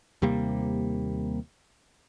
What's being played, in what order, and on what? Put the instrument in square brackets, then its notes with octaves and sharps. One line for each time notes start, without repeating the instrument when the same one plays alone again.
[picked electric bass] D#2 C3 G3 A#3